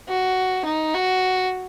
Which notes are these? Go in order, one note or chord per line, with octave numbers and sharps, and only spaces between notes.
F#4
D#4
F#4